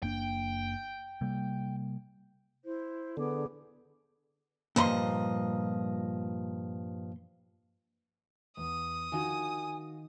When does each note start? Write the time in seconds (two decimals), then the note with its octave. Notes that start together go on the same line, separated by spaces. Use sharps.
0.03 F#1 A#3 D4 G5
1.21 C3 G3 A#3
2.64 E4 C5
3.17 D3 B3 G#4 D6
4.76 G2 A#2 F3 D#5 B5 C6
8.57 E2 D#6
9.12 D#3 D#4 F4 F#4 G#5